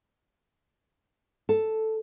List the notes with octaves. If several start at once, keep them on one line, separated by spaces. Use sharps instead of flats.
A4